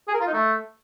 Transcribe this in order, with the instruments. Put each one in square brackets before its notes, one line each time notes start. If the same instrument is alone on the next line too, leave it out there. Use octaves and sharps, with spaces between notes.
[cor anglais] G#4
A#4
F4
D#4
A3